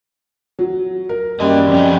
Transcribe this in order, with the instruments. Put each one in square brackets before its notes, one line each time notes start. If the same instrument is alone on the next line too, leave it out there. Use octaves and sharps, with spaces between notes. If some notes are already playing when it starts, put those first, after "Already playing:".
[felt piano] F#3
A#4
[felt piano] F#2 [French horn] G3 [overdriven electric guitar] A#3 D#5
[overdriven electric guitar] F2 C#4